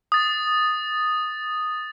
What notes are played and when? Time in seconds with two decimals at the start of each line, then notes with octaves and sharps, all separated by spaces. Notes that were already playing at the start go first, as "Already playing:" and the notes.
0.12 D#6 A6